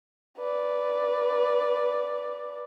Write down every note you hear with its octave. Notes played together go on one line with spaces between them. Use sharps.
B4 D5